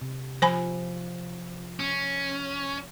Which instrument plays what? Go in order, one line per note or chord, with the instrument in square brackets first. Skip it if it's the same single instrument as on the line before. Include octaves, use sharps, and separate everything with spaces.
[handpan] C3
[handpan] F3 [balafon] C5 G#5 B5
[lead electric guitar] C#4